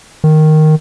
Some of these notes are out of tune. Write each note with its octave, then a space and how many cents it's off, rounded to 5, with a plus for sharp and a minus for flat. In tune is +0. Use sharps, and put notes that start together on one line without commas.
D#3 -5